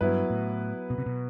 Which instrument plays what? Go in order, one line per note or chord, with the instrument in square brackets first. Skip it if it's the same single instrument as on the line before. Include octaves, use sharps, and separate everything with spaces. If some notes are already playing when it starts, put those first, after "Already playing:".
[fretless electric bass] G2 [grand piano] F#3 B3 E4 B4
[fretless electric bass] A2
B2
C3
B2